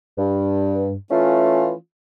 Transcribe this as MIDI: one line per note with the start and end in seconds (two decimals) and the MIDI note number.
0.18 0.94 43
1.11 1.72 52
1.11 1.72 57
1.11 1.72 61
1.11 1.72 65